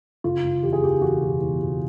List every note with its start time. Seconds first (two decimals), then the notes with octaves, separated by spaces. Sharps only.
0.24 F#1 F4
0.44 F#1
0.63 E2 G4
0.73 G#4
0.82 E2 G4
1.01 E2 F#4
1.21 B2
1.41 E2
1.60 B2